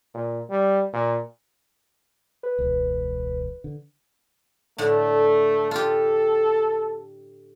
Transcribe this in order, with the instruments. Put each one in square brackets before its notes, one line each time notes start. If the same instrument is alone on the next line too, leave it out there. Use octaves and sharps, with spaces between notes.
[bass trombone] A#2
G3
A#2
[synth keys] B4
[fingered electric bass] E1 C#2
D3
[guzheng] A2 D3 [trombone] A3
[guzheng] F4 G4 [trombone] A4